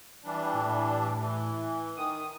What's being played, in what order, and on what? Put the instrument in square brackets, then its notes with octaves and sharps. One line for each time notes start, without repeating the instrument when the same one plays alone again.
[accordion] E3 G3 D4
[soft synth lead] A2
[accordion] E3
[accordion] D#3 [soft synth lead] D#6